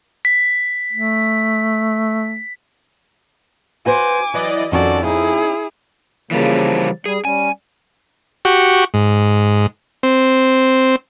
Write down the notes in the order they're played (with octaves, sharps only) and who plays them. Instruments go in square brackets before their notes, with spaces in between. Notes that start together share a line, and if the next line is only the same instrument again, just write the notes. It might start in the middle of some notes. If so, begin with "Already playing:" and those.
[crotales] B6
[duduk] A3
[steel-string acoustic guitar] F#4 B4 C5 [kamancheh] G#5 D6
[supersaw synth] E3 D5 D#5 [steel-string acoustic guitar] F#3
[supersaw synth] F2 [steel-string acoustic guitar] D#3 C#4 A4 [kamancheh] F#4 D5
[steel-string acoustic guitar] C#4 D#4 [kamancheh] E4 G#4
[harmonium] C#3 F3 A#3 [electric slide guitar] E3 G3
[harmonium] G3 [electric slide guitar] G#4
[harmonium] G3 C#4 [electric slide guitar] G#5
[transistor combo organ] F#4 G4 C#6
G#2
C4